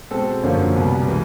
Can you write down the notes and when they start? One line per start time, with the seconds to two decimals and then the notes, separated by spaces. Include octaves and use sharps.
0.11 B2 G#3 C4 A4
0.43 F#2 D3 F3 A#3 C#4
0.76 C2 B2 G3 B3
1.08 E3 G#3